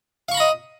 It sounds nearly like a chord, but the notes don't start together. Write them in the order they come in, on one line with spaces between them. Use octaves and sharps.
F5 C#6 B5 A#5 D#5